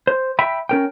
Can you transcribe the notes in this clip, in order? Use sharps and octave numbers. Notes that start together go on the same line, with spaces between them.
C5
E5 G5 B5
C#4 A#4 G5